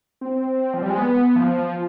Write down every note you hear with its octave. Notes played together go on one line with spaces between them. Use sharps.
C4
F3
G3
G#3
B3
F3